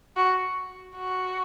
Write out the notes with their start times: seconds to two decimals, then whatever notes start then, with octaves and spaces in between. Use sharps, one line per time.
0.17 F#4
0.96 F#4